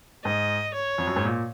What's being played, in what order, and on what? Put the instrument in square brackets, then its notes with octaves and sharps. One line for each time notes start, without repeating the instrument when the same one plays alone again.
[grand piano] G#2 [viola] D#5
[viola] C#5
[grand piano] F2
F#2
G#2
A#2